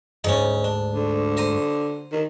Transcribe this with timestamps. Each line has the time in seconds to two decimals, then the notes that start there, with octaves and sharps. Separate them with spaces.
0.24 D2 G#2 C#4 D#4
0.64 D4
0.94 D3
1.37 C5 A#5 D#6
2.12 D#3